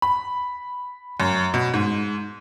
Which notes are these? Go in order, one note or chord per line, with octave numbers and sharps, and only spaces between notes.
B5
F#2
B2
G#2